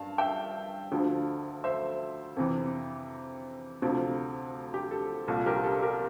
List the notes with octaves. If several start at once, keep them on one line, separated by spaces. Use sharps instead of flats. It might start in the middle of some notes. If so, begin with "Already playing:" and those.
Already playing: G2 F5 A5
E5 G5
D2 D3 F3
C5 E5
F2 C3 E3
D2 C3 F3
G4
A4
C2 A#2 F3 A4
G4 A#4
A4
G4 A#4